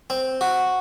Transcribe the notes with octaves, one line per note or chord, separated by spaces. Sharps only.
C4
F#4